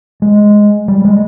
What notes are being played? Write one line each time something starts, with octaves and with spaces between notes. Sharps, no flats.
G#3
G3
G#3